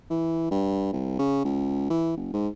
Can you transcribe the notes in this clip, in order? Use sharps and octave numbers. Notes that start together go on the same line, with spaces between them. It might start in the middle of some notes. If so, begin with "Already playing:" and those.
E3
G2
C2
C#3
C#2
E3
F#1
G#2